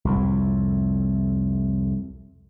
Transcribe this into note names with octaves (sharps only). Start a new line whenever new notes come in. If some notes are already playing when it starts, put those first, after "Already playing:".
C2 F2 A2